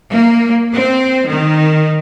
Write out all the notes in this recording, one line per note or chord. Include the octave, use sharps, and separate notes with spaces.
A#3
C4
D#3